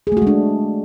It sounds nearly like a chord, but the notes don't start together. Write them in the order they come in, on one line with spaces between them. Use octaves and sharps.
G#4 A3 F#4 G#3 D4